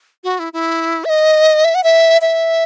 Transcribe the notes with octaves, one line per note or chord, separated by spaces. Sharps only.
F#4
E4
E4
E5
D#5
E5
F#5
E5
E5